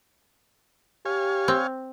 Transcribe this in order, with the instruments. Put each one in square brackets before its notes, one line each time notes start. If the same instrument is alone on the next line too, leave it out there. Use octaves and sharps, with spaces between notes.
[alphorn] G4 [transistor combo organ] C#5 F5 G#5
[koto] C4